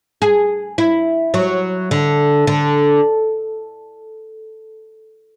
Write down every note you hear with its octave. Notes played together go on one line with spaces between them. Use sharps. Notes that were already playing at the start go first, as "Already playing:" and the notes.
G#4
E4
F#3
D3
D3